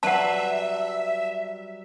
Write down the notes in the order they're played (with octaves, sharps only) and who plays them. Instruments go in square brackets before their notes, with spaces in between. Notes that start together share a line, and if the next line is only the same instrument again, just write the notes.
[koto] F#3 G3 B4 [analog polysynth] E5 [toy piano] F#5 A5